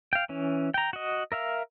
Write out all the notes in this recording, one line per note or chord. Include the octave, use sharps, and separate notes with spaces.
F5 G5
E3 C#4
G5 A#5
F#4 D#5
A#4 E5 F5